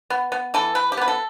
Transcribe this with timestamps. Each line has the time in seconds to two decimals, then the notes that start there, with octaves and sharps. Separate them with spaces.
0.10 B3
0.32 B3
0.54 E3 A4
0.75 E3 B4
0.92 G4
0.97 B3 B4
1.08 A4